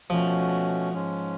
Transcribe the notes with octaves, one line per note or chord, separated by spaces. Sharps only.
B2 F3 A3 C#4 F#4
G#2 G#3 C#4